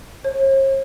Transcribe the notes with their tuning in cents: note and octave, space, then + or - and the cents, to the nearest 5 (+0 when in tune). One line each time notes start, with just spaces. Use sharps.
C#5 -45